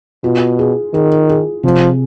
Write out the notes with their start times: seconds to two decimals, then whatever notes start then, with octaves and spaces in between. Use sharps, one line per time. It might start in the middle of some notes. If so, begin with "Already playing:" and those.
0.24 B2 F4
0.59 G#4
0.93 D#3 G#4
1.29 G#4
1.63 C3 F3